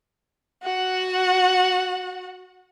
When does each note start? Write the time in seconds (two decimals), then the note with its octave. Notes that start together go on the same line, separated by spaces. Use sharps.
0.63 F#4 F#5